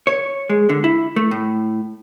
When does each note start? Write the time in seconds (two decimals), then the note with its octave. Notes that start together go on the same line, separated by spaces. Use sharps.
0.07 C#5
0.50 G#3
0.69 D3
0.84 E4
1.16 A3
1.31 A2